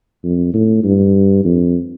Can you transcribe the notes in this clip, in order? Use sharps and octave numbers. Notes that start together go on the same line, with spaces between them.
F2
A2
G2
F2